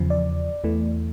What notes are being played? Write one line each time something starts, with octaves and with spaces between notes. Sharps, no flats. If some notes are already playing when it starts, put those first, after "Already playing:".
Already playing: E2 C#3 F3
D5
E2 E3 A3